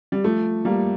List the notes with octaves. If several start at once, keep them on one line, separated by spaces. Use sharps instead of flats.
G3
F3 A3
G3 A#3